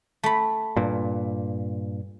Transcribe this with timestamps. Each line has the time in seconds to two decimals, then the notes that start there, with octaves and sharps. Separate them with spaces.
0.23 A3 B5
0.76 G2 A#2